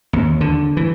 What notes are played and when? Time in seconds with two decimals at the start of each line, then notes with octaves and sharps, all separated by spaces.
0.13 D#2
0.41 D3
0.77 E3